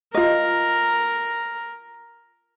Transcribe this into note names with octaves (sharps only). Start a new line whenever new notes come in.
F4 A#4 D#5